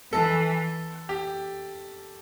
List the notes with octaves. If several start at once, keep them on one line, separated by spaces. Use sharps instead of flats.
E3 A4
G4